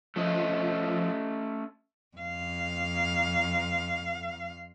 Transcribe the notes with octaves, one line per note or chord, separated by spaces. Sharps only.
F3 A3 C#4 D#5
F2 F5